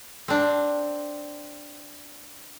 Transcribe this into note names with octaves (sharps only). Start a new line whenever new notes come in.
C4 D4